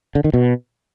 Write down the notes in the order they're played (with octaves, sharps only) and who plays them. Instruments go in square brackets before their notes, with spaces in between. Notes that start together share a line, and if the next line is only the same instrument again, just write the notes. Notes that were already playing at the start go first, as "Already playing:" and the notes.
[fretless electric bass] D3
D#3
B2